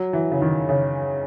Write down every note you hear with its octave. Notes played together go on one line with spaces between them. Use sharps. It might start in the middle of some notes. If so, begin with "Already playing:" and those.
Already playing: F#3
E3
C#3
D#3
C#3